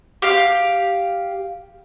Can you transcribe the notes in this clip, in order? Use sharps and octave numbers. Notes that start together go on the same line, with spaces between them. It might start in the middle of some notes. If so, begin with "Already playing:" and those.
G4 F5